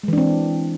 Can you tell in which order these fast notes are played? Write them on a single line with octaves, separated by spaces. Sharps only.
G#3 E3 D4 C4